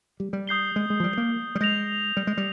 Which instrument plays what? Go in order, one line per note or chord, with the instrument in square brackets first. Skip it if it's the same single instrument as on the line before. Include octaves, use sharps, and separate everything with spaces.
[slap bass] G3
G3
[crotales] D#6 G6 C7 G7
[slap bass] G#3
G#3
F3
G3
A#3
G3
[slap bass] G#3 [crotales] G6 A#6 F7
[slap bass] G3
G#3
G3